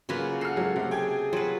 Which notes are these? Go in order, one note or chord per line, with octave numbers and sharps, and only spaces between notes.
C#3 F#3 A#3 F4 B4 C#5
A4 F#5 F6 C7
F#3 G#3 A#3
C3 A3 F#5
G#4 G5 G#5 G#6
F#3 F4 B4